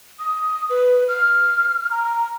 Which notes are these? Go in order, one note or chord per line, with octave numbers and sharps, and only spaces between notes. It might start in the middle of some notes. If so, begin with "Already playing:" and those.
D#6
B4
F6
A#5